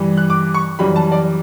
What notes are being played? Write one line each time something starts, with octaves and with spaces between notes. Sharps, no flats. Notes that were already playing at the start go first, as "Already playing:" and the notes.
Already playing: G2 E3 G3
F#6
D6
C#6
F#2 E3 G3 B5
A5
D5